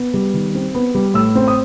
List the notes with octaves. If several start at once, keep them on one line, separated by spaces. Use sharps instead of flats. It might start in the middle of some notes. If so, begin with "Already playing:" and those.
Already playing: B3
G3
D#3
C4
B3
G3
A2 E6
C4
D#6